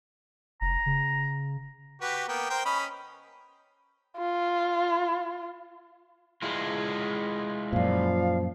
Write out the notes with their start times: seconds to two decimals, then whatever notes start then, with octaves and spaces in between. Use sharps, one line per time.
0.61 F1 A#5
0.86 C#3
2.01 F#4 G4 B4
2.28 A#3 B3 G5
2.50 A#4 C5 G5
2.65 C#4 D#5 B5
4.18 F4
6.42 G#3 E4 F4
7.73 F#2 A#2 F3 D5 F5